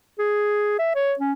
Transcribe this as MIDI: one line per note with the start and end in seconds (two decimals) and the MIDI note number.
0.19 0.77 68
0.79 0.90 76
0.95 1.14 73
1.19 1.33 61